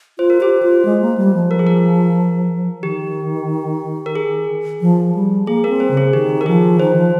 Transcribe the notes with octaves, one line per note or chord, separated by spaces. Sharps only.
F4 C5
A#4
G4 C5
F4
G#3
A#3
G3
F3
A#4
G#4
A#4
D#3 G4
A#4
G#4
F3
G3
A#3 G#4
C4 A#4
C5
C#3
G#4
D#3 G4
A#4
F3 G#4
D#3 C5
F3